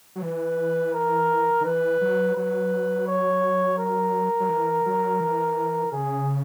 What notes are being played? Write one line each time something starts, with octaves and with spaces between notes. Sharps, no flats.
F#3
E3 B4
A#4
D#3
E3 B4
F#3
F#3 B4
C#5
A#4
F#3
E3
F#3
E3
C#3 G#4